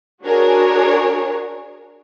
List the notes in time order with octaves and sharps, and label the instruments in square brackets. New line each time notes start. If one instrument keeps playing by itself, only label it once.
[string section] D4 F#4 G#4 A#4 C#5